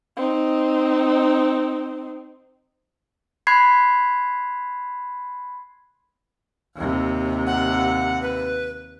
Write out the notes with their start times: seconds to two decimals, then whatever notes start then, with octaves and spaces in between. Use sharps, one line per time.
0.17 C4 D#4
3.47 B5 C6 F#6 G#6 B6 C7
6.76 D#2 C3
7.47 F#5
8.22 B4